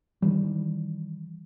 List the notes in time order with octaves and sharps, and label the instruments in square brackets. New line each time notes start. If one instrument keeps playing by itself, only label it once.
[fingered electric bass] D#3 E3 G3